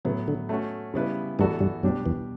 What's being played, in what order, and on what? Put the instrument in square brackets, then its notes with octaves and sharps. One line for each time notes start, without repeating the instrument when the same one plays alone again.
[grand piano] A2 F#3 B3 [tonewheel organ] C#3
[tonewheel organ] D3
[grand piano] A3 C#4 F#4
C#3 G3 B3 E4 B4
[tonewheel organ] G2 G3 [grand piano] E3 B3 F#4 A4
[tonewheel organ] G2 G3
[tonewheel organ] F#2 F#3 [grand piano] B2 G3 D4 G4
[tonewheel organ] E2 E3